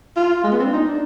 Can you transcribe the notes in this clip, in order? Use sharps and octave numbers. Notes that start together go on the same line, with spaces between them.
F4
G#3
B3
C4
D4
D#4
D4